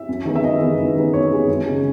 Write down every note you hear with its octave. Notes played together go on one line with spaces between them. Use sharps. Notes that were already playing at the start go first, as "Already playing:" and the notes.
Already playing: E5
F#2
D#3 G#3 B3
E5
F#2 D#5
D#3 G#3 B3
F#2
D#3 G#3 B3
F#2 C#5
D#3 G#3 B3
F#2
C#3 G#3